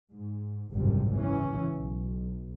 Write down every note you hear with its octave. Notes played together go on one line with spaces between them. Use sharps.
G#2
G#1 C#2 F#2 A2 C3 G3
C#3 E3 C#4
B1